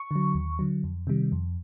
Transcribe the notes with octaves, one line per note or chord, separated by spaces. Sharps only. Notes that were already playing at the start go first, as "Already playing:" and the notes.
Already playing: C#6
D3 F#3
D#2
D3 F#3
F2
C3 D#3 G3
F2